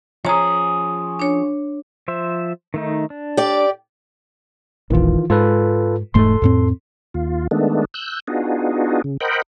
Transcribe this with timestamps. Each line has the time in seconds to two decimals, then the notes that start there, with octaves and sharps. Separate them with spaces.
0.25 F3 C#4 G#4 C#5 A#5
1.19 D4 C#5
2.08 F3 C5 E5
2.74 D#3 A3 D#4
3.10 D4
3.37 G4 D5
4.90 E1 A#1 D#3 E3 F4
5.30 G#2 F4 A4 B4
6.14 E1 G#2 A3 A4 C6
6.42 F2 A2 C4
7.14 D#2 F4
7.51 D#3 G#3 A3 B3 D4
7.94 E6 F#6 G6
8.28 B3 D4 D#4 F4 F#4 G#4
9.04 C#3
9.21 A#4 C5 D#5 F#5 G5 B5